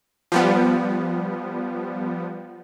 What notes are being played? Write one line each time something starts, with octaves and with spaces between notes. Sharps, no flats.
F3 G3 B3